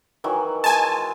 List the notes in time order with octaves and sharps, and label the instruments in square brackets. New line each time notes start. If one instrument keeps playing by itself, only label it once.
[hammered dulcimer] D#3 E3 F#3
[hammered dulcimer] G#3 [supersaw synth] G#5 A5